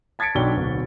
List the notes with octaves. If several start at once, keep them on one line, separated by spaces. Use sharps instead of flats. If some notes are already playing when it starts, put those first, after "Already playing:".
A5 G#6 A6 B6 C#7 D7
B1 F#3 D4 G5 G7
D1 B1 F#4